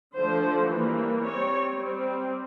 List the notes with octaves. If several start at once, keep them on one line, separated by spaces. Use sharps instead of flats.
D3 F3 A3 C5
E3 G3 A#3
G3 C4 C#5
G3 C4